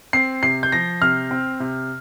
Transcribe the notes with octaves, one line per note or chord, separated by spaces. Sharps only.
C4 C7
C3 C7
G6
F3 A#6
C3 F6
C4
C3